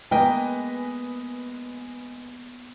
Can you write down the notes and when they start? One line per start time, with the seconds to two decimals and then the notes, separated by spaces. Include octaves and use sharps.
0.11 G#3 A#3 B3 B4 D#5 G5 G#5